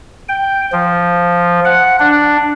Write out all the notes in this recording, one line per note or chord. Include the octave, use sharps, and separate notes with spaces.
G5
F3
F#5
D4